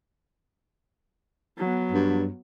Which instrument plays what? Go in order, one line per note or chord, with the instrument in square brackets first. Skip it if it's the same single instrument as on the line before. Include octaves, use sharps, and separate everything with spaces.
[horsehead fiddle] F#3 B3
[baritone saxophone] G2